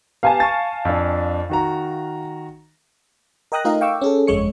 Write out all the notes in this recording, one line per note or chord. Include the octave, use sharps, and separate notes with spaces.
B3 G4 F5 G#5 A5
C#6 A6
F2 D4
D#3 F#4 A#5
A#4 D#5 G5 D#6 F#6 A#6
A3 D#4 F4 A#4 D#5 F5
F5 G5 C#6 D6 E6
C#4 G#4 A4
G1 F2 G#3 C#5 C#7